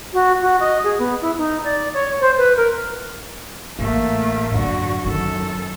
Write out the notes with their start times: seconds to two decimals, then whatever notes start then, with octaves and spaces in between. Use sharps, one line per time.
0.13 F#4
0.42 F#4
0.60 D#5
0.84 G#4
0.99 B3
1.21 E4
1.38 D#4
1.64 D5
1.94 C#5
2.21 C5
2.38 B4
2.57 A#4
3.79 A1 A2 A3 A#3
4.55 F#2 D3 F#4
5.04 F#2 D#3 D#4 A4